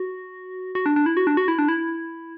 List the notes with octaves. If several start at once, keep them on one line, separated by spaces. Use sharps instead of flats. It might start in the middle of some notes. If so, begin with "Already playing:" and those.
Already playing: F#4
F#4
D4
D4
E4
F#4
D4
F#4
E4
D4
E4